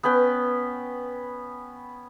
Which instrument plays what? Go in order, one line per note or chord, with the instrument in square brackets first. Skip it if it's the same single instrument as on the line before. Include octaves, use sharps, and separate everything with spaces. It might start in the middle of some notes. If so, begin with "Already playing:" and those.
[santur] B3 C#4 B4 G5